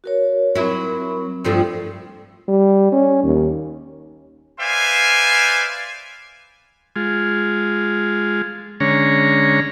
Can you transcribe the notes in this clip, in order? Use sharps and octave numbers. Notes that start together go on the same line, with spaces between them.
F#4 A#4 C#5
F#3 C4 E4 A#4
G2 F3 A3
G3
C#4
D#2
B4 C5 D5 E5 F5 G#5
G#3 F4
D3 G#3 C#4 C#5 A#5